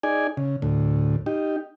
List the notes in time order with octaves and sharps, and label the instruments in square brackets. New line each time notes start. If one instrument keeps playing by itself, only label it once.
[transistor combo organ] D#4 G#4 D5 G#5
C#3
D2 A2
D#4 G4